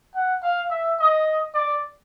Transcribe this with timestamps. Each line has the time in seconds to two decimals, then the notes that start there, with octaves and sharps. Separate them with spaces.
0.15 F#5
0.43 F5
0.70 E5
1.00 D#5
1.54 D5